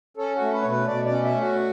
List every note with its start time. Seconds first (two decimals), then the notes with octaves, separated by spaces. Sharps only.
0.17 C#4 A4
0.35 F#4
0.41 A3
0.53 B4
0.62 B2 C#5
0.70 B4
0.88 B2 D5
1.05 D5
1.11 C#4
1.23 E5
1.35 A3
1.40 F#4